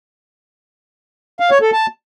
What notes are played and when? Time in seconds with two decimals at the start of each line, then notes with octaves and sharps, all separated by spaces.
1.40 F5
1.51 C#5
1.62 A4
1.73 A5